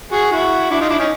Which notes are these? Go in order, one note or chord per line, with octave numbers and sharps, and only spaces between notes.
F#4 G#4
E4 F#4
D4 E4
D#4 F4
D4 E4
C#4 D#4